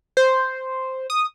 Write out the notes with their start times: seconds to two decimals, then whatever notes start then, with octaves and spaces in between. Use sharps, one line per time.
0.17 C5
1.10 D#6